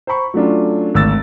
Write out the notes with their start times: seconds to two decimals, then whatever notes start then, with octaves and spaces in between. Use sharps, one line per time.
0.07 C5 A#5 B5 C#6
0.34 F#3 A3 C#4 D4 F4
0.94 G#1 D2 E6 A6